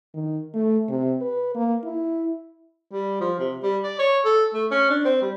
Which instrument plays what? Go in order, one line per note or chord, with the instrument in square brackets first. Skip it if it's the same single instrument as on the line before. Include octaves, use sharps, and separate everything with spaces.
[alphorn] D#3
A3
C3
B4
A#3
E4
[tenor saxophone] G3
F3
C3
G3
D5
C#5
A4
A3
C#4
D4
C4
G3